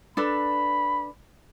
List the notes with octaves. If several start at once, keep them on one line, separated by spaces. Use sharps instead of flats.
D4 A4 B4 B5